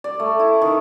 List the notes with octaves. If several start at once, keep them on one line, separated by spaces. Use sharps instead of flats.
D5
A3
E4
D#3